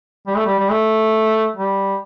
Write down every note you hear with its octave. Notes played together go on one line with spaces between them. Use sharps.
G3
A3
G3
G3
A3
G3